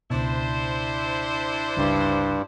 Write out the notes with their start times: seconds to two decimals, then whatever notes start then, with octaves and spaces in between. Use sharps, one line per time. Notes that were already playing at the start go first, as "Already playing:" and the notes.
0.10 C#2 B2 D4 E4 C5
1.76 G1 C#2 G2